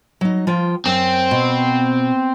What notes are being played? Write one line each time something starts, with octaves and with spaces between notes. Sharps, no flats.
F#3 D#4
F3 F4 G5
F#2 C4
B2